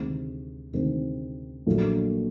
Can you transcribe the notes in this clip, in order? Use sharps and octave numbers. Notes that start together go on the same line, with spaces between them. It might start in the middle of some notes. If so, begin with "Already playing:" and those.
Already playing: D2 C3 D#3 G#3 C4
D2 C3 D#3 G#3 C4
A#1 A#2 F#3 A3 D4